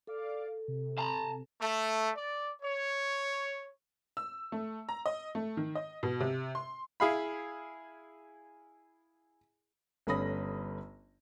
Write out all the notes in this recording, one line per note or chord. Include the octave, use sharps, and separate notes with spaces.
A4 D5 F5 D6
C3
A5 A#5
A3
D5
C#5
E6
A3
A#5
D#5
A3
D#3
D#5
B2
C3
C6
E4 G#4 F5 B5
G1 A3 C#4 B5 D#6 A#6